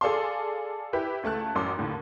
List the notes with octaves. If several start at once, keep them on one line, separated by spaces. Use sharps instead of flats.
G#4 A4 D5 F5 A5 C6
E4 G4 B4
C#2 A3 A5 F#6
A1 F#2 C6 D6
D#2 A2 D3